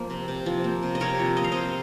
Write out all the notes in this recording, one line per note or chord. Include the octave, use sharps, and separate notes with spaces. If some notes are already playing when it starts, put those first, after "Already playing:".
Already playing: F3 A#3
C3
C3
F3
A#3
C3
D#5
C3 A#4 C#5
F3
A#3 D#5
F5
C3 C5 D#5